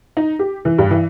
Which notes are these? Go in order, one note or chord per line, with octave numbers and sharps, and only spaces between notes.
D#4
G4
E3
G2
E3